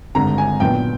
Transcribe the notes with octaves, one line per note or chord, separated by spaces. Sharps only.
G#1 G2 D3 A#5
G#5
B1 A#2 F#3 B3 D4 G5